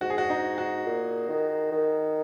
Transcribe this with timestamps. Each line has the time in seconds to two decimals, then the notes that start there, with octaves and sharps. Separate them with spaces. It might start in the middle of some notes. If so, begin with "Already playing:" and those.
0.01 G#2 F#4
0.10 G#4
0.18 F#4
0.30 D#4
0.58 F#4
0.86 A#2
1.29 D#3
1.72 D#3